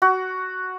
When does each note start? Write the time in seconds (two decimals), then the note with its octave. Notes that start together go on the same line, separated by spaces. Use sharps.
0.02 F#4